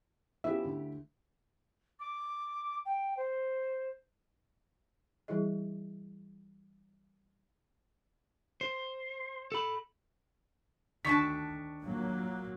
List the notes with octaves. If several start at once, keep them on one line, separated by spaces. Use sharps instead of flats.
F3 B3 C#4 E4 G4 E5
D2
D6
G5
C5
E3 G3 E4 G#4 D#5
C5
A4 B5
D2 D#3 D4 A5 C#6 B6
A#2 F#3 A#3